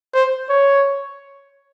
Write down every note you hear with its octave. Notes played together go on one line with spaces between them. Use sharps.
C5
C#5